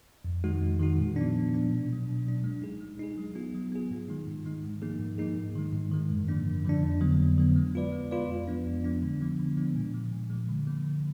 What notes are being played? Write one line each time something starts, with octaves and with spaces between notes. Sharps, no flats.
F2
D#3 G#3 D#4 F#4
F2
D#3 G#3 D#4 F#4
A#2
F3 B3 D4
A#2
F3 B3 D4
B2
F#3 D4
B2
F#3 D4
G#3
D#4 G#4
G#3
D#4 G#4
F#3
B3 F4 G#4
F#3
B3 F4 G#4
G#2
D#3 G#3 D#4
G#2
D#3 G#3 D#4
G#2
F3 A#3 D#4 G#4
G#2
F3 A#3 D#4 G#4
G#2
D#3 G#3
G#2
D#3 G#3
F#2
D3 F3 A#3 D4
F#2
D3 F3 A#3 D4
F2
D3 F#3 B3
F2
D3 F#3 B3
G#3
B3 F4 B4 D5
G#3
B3 F4 B4 D5
F2
F3 G#3 B3 D4
F2
F3 G#3 B3 D4
D3
F3 G#3 B3 D4
D3
F3 G#3 B3 D4
A#2
F3 G#3
A#2
F3 G#3
D3
F3 A#3
D3